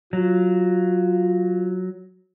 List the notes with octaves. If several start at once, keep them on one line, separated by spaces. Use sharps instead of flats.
F#3 F4